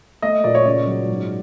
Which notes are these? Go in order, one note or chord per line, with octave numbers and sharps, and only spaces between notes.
A3 D#5
A#2 D5
C#5
C#2 D5
F#3
G#2